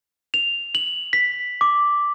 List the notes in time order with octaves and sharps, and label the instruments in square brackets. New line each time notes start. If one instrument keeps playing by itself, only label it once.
[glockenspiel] F7
F#7
B6
D6